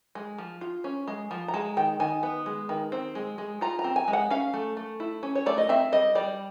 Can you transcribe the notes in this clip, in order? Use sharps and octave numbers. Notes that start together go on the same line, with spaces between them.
G#3
F3
F4
C#4
G#3
F3
A#5
G#3 A5
D#3 G5
D#3 G#5
B3
G#3
D#3
C4
G#3
G#3
F4 A#5
A#5
C4
G#5
G#3
F#5
C#4 F5
A3
A3
E4
C#4
C#5
A3 D5
D#5
C4 E5
G3 D#5
G3 D5